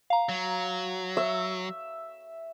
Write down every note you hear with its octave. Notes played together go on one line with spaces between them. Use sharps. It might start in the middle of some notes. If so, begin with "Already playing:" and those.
F5 A#5
F#3
E5